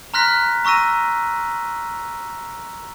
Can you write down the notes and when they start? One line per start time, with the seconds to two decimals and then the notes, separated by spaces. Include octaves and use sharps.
0.14 A#5 C6 F6 F#6 A#6 B6
0.65 A#5 C#6 E6 A#6 D#7